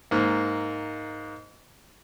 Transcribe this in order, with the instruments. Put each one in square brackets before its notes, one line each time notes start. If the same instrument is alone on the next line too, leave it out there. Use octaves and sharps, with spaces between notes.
[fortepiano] G#2 A#3